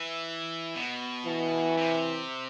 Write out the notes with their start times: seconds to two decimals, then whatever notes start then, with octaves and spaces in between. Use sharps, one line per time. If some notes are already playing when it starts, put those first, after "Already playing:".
Already playing: E3
0.76 B2
1.26 E3
1.77 C3